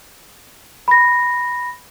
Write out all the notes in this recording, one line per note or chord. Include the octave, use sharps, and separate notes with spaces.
B5 A#6